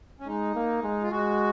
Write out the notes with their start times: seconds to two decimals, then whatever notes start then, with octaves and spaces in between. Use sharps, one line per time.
0.20 C#4
0.27 G#3 D#4
0.55 A#3
0.83 G#3
1.02 F4
1.11 G#3 F#4